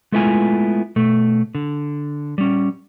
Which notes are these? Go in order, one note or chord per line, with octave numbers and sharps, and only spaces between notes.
G#3 A3 B3 E4 F4 G#5
B2 A3
D3
G3 C#4